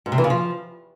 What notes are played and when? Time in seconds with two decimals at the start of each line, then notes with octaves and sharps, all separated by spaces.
0.06 G#2
0.12 C3
0.18 E3
0.24 C#3
0.30 F3